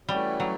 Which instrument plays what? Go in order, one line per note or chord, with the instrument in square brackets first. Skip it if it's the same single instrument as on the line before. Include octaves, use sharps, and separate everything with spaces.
[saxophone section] E3 A3 C#4 F#4 C#5 [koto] G3
[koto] F#3